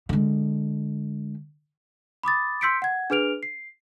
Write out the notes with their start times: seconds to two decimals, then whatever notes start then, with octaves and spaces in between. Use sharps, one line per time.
0.09 D3 G#3
2.23 B5 D6 D#6 A6
2.61 C6 E6 G6 B6 C#7 D7
2.82 F#5 G#6
3.10 D4 G#4 B4 F6 D7 F7
3.43 C7